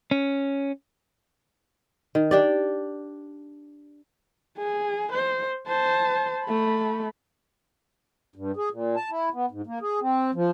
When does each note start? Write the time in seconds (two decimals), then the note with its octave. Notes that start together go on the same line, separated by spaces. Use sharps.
0.11 C#4
2.15 D#3
2.31 D4 G4 D5
4.58 G#4
5.12 C5
5.67 C5 A5
6.44 A3 B5
8.36 G2
8.57 G#4
8.71 A#2
8.96 A5
9.10 E4
9.34 B3
9.51 G#2
9.67 A#3
9.82 G#4
10.01 C4
10.34 F3